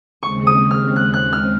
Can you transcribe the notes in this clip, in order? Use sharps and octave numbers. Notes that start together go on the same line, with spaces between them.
D#2 C#3 G#3 C4 C#6
D#6
F6
F#6
F#6
F6